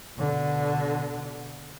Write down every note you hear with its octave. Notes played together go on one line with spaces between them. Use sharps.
B2 D3